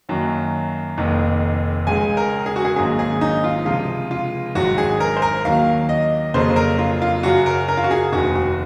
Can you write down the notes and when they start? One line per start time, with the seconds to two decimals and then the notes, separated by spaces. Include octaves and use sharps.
0.09 F#2 D#3 F#3 A#3
0.97 F1 F2 D#3 A#3
1.87 C#2 C#3 G#3 G#5
2.17 A#4
2.46 G#4
2.56 F#4
2.65 G#4
2.76 G#1 G#2 F#3 A#3 G#4
2.99 G#4
3.21 D#4
3.44 F4
3.65 C#2 C3 F3 G#3 F4
4.11 F4
4.55 G#1 G#2 D#3 F#3 F#4
4.78 G#4
5.00 A#4
5.17 C5
5.22 A#4
5.45 D#2 D#3 F#3 A#3 F5
5.89 D#5
6.34 F2 C#3 F#3 A#3 C5
6.56 A#4
6.79 F4
7.02 F4
7.23 F#2 C#3 F#3 F#4
7.46 A#4
7.68 A#4
7.77 F4
7.84 F#4
7.91 G#4
8.13 F1 D#2 D#3 F#4
8.35 F#4